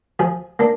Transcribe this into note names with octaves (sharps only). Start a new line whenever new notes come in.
F3 G#4
A#3 D4